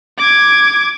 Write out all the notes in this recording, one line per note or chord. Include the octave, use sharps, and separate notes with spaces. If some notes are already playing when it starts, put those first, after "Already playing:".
D6 G#6